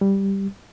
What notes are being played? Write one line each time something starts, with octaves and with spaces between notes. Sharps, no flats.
G3